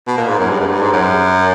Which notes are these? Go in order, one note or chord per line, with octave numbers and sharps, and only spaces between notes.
B2
A#2
G#2
F#2
G2
F#2
G#2
G2
G#2
F#2